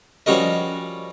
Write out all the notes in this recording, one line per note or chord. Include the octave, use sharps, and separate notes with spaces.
F3 G3 C#4 F#4 A#4 D#5